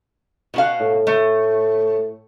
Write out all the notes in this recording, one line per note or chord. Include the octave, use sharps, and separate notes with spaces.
B2 F#4 F5
A2
A3